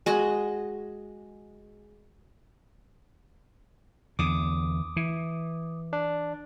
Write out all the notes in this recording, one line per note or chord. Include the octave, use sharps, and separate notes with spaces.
G#3 F#4 D#5
E2 D3 D6 D#6
E3
D4